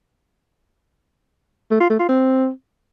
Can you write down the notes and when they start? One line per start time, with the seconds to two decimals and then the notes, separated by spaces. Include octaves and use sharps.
1.71 A3
1.80 F4
1.90 A3
1.99 F4
2.09 C4